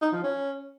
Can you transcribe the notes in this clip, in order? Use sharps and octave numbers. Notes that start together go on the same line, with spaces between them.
D#4
F3
C#4